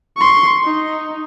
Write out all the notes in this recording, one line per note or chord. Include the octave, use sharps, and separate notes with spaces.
C6 C#6
D#4